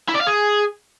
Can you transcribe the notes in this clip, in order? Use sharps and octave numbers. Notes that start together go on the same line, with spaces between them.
E4
D5
F5
G#4